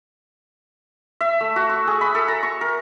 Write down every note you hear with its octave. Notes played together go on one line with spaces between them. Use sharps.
E5
A3
F#4
C#6
G#4
B5
A4
A#5
C#6
A#4